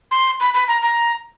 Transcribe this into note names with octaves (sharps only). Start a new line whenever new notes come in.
C6
B5
B5
A#5
A#5